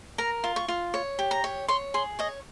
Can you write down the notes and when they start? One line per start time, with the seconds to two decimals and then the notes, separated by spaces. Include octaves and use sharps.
0.18 A#4 A#5
0.44 F4
0.56 C#6
0.68 F4
0.94 C#5
1.19 G4
1.31 A#5
1.44 C#5
1.68 C#5 C6
1.94 G#4 C6
2.19 C#5 D#5